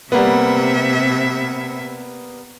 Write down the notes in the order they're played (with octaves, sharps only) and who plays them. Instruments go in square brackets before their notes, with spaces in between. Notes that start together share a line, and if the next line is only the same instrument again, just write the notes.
[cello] C3 E5 [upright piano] G3 A#3 B3